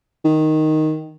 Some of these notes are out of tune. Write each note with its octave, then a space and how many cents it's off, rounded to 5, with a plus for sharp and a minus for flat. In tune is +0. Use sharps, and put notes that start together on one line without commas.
D#3 +0